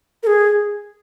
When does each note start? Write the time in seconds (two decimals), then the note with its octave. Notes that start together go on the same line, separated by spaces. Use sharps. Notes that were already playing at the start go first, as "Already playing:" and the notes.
0.23 A#4
0.27 G#4